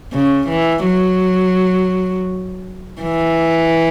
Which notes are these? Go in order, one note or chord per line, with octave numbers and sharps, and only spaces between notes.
C#3
E3
F#3
E3